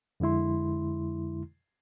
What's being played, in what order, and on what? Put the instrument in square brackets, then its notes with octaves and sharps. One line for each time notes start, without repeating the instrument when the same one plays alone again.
[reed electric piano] F2 D3 G#3 E4 C6